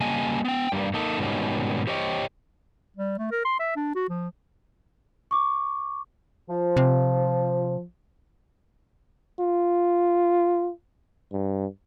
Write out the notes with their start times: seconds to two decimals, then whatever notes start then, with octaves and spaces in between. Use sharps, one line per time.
0.01 C#3 G3 A#3 D#5 G#5 A5
0.45 B3 G5
0.72 G2 G3 A#3
0.94 A#3 D#4 A4
1.18 G#2 B2 D#3 G3 C#4
1.87 G4 C5 C#5 D#5 G5
2.96 G3
3.18 A3
3.32 A#4
3.45 C6
3.60 E5
3.76 D4
3.95 F#4
4.09 F3
5.31 C#6 D6
6.49 F3
6.77 C3
9.40 F4
11.32 G2